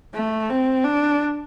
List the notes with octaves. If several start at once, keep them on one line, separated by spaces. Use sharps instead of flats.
A3
C4
D4